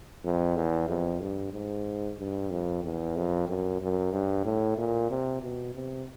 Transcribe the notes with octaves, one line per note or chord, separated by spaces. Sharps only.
F2
E2
F2
G2
G#2
G2
F2
E2
F2
F#2
F#2
G2
A2
A#2
C3
B2
C3